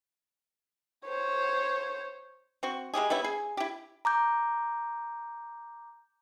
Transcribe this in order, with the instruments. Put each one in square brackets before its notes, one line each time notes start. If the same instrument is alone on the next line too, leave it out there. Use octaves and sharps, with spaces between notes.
[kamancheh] C5 C#5
[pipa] C4 F#4 C#6
G#3 E4 G4 G#4
G3 B3 E4 C#5
G#4 G#5
E4 G4
[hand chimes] A#5 D6 G6